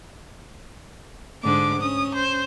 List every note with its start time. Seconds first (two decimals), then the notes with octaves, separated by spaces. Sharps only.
1.44 G#2 D3 D6
1.82 C#4 D#6
2.15 C5